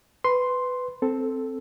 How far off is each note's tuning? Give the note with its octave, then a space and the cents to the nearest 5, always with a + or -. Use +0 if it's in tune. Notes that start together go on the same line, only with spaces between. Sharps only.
B4 +15 C6 +0
C4 +0 A4 +0